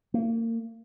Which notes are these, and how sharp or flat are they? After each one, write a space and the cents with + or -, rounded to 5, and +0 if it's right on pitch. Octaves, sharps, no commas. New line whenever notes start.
A#3 -35